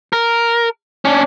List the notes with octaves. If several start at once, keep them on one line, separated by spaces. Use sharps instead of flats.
A#4
C#4 D4